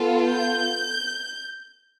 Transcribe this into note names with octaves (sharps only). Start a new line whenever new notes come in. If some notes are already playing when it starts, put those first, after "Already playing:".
Already playing: B3 F4 A4
G6